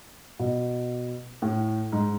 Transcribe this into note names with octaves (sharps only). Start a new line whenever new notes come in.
B2
A2
G#2